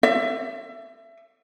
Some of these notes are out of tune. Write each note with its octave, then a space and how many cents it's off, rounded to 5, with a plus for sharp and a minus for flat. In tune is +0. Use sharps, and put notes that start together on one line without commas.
E5 +25